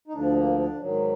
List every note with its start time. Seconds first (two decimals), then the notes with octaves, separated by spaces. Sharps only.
0.08 D#4
0.14 D2 D3 F3 D4
0.36 A#3
0.58 D4
0.80 G#2 D#3 F#3